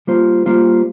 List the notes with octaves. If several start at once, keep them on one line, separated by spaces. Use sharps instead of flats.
G3 A#3 F4 C5
G3 A#3 F4 C5